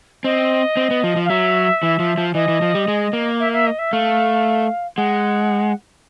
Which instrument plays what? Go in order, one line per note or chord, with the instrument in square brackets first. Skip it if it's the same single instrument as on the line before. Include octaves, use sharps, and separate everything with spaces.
[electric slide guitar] C4 [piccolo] D#5
[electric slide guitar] C4
B3
F3
F3
[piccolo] F5
[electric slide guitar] F#3 [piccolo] E5
[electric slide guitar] E3
F3
F3
[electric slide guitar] E3 [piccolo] D#5
[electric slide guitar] E3
F3
G3
G#3
A#3
[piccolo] E5
E5
D#5
E5
[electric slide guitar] A3 [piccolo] F5
[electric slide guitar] G#3 [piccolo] F#5